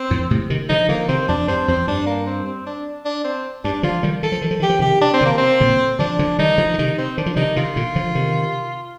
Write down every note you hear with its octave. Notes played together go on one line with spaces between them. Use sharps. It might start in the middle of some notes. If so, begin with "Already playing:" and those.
Already playing: C4
F2 A2
A2 C3
C3 D#3
D3 F3 D#4
D3 F3 A#3
C3 D#3 C4
F2 D4
G2 C4
F2 C4
G2 D4
A#3
C4
C4
D4
D4
C4
G2 D4
D3 F3 F4
D#3 G3
D#3 A4
F3
D#3
F3
D#3 G4
F3
C3 D#3 G4
D4
C4
C3 D#3 A#3
C4
A#2 D3
D3 F3 D4
D3 F3
D#3 G3 D#4
D3 F3
D3
C3 D#3 D#4
C4
D#3 D4
F3
C3 D#3 D#4
C3 D#3 F4
A#2 D3
D3 F3
C3 D#3